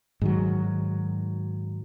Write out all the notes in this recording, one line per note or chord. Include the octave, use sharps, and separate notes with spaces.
G#2 D#3 F#3